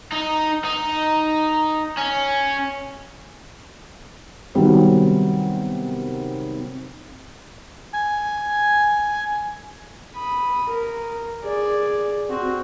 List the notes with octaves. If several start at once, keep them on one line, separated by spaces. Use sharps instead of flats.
D#4
D#4
C#4
C3 D#3 F#3 G3 B3 C4
G#5
B5 D#6
A#4
G#4 D5
C4 F#4